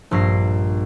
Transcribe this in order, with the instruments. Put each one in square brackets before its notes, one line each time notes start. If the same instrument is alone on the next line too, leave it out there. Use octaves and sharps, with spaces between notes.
[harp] A#1 G2 A#6 C7